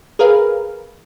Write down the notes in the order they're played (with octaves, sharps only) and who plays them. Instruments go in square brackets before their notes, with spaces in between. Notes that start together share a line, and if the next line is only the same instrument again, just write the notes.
[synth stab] G#4 A#4 B4 F5